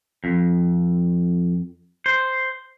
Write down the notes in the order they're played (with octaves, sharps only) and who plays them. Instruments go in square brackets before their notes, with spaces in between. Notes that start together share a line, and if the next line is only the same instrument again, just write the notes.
[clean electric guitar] F2
C5